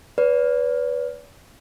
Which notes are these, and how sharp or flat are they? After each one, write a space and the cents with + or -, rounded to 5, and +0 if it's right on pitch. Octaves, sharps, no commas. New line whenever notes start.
B4 +0 D5 -45